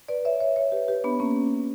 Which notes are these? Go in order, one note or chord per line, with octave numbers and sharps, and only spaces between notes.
B4 D5
C#5 E5
C#5 E5
C#5 E5
G4 B4
G4 B4
B3 D4
A#3 C#4